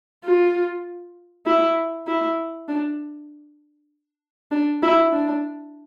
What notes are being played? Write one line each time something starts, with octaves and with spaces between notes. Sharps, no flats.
F4
E4
E4
D4
D4
E4
D4